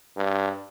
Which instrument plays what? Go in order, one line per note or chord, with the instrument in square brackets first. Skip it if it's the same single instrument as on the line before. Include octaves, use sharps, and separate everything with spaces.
[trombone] G2